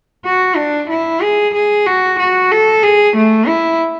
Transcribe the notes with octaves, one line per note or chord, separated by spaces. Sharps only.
F#4
D4
E4
G#4
G#4
F#4
F#4
A4
G#4
A3
E4